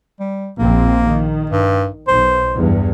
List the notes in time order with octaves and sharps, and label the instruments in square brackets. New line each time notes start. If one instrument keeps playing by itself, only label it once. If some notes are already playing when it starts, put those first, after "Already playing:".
[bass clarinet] G3
[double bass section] A#1 C4 [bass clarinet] A#3
[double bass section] D#3
[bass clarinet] G2
[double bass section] B1 [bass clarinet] C5
[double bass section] E2 G2